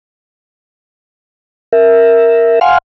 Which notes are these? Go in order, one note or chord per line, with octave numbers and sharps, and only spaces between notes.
A#4 E5
F5 F#5 G#5 C6 F6